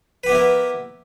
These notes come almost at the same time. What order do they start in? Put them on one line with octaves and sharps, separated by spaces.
B4 G4 B3 E4 A#4